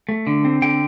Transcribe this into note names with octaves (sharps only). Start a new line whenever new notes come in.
A3
D3
C4
D3 G5